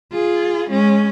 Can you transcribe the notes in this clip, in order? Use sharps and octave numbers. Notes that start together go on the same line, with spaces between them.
F4 G#4
G#3 C#4